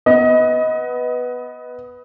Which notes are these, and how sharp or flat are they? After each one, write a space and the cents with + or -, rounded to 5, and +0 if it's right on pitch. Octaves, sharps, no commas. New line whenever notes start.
B3 +0 D#5 +20